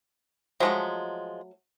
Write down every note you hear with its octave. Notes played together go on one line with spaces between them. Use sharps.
F3 F#3 G#3 A3 F#5